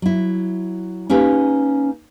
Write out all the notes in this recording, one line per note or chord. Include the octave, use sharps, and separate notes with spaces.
F#3 E4
A#3 C#4 D#4 G4 B4